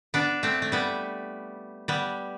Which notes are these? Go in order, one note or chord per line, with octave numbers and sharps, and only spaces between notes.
B3 D4
A3 C4
A3
G3 B3
G3 B3